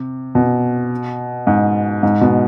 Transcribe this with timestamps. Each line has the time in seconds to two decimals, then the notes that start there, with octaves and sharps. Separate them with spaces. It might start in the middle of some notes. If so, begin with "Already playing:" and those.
Already playing: C3
0.35 B2
1.47 G#2
2.03 G#2
2.21 B2